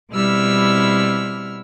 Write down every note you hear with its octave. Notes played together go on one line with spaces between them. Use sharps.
B2 G3 C4 E4 E6 F6